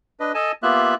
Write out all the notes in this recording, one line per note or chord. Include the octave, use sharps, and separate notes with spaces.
D4 B4 D#5
A4 D#5 G#5 A5
A#3 B3 F4 G4 E5 F#6